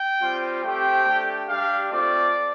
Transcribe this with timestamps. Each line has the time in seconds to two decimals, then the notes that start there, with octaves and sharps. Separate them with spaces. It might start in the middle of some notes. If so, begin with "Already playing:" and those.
Already playing: G5
0.21 G3 C4 F4
0.63 A3 C4 G4 G5
1.06 A3 D4 G4
1.49 G3 D4 G4 F5
1.91 A3 C4 F4 D5